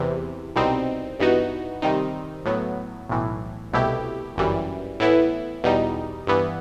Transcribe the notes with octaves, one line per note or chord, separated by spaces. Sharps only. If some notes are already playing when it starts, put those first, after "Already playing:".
Already playing: E2 C3 E3
C2 B2 G3 C4 D#4
G2 E3 B3 D#4 F#4
C3 D#3 G3 C4 D#4
A2 F#3 B3
B1 A2 E3
C2 B2 A3 E4 G4
G1 F#2 E3 G3
A2 E3 B3 E4
E2 B2 G3 D#4
G2 E3 B3